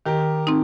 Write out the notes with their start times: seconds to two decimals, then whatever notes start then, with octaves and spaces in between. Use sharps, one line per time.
0.06 D#3 G4 A#4
0.47 C4 D#4